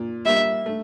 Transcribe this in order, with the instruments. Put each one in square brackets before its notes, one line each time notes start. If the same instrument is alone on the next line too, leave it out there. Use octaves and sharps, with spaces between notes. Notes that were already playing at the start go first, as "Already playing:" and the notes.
Already playing: [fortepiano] A#2
[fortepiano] G3 A#3 [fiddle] E5
[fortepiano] A3